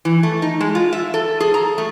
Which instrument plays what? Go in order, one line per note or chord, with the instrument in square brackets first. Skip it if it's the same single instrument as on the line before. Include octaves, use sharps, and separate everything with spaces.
[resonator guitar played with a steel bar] E3
A3
D#4
G#3
F4
E5
A4
G#4
A#5
A3